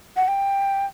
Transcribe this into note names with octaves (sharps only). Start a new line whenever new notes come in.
F#5
G5